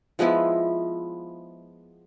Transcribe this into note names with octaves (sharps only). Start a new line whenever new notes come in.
F3 G#3 B3 E4